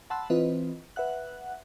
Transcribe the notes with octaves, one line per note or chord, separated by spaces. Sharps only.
F#5 A5 B5 C6 E6 F#6
E3 C4 F4 B4 D#5
B4 E5 F#5 F#6